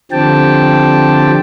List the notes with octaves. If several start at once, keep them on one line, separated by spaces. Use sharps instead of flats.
D3 F3 C4 G4 G5 A5